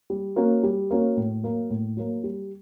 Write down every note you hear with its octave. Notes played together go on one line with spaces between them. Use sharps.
G3
A#3 C#4 F#4
G3
A#3 C#4 F#4
A2
F#3 A#3
A2
F#3 A#3
G3